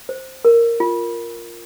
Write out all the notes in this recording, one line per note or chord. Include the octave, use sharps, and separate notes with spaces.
C5
A#4
F4